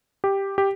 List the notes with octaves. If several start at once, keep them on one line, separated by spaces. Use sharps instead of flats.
G4
G4